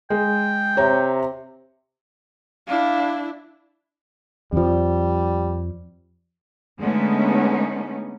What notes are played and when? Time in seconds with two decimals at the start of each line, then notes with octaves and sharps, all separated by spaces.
0.10 G#3 G5
0.77 C3 C#5 A#5
2.67 D4 E4 F5
4.53 F2 F3 G3
6.80 D3 G#3 A3 B3 C#4 D#4